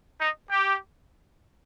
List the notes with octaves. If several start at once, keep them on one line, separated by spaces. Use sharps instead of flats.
D#4
G4